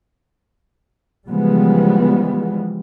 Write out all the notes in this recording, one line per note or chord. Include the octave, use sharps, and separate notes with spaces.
C#3 E3 F3 G3 G#3 B3